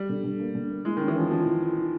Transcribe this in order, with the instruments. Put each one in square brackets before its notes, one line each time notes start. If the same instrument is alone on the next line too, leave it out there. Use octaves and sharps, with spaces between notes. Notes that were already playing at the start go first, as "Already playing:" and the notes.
Already playing: [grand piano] G3
[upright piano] D3
D3
A#3
D3
A#3
[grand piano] G#3 [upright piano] E4
[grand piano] D#3
[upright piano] C#4
[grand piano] E3
[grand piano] F3 [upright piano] C#4
[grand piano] F3 [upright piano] C#4
[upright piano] E3
E4
D#3